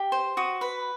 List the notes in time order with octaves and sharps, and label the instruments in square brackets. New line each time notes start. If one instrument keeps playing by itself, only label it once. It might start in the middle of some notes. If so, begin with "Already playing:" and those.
Already playing: [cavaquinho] G4
C5
F#4 D#6
B4 B5